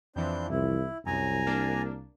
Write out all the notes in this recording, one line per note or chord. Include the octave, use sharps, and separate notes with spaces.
F2 E3 F3 C4 D4 G6
C2 E4
C2 F#2 G#5 A#5
A#3 D4